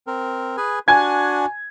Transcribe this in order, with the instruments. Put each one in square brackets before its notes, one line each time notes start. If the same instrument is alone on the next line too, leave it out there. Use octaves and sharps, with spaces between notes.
[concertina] C4 A#4
G#4 B4 G#5
[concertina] D4 F#4 [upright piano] G#5 G#6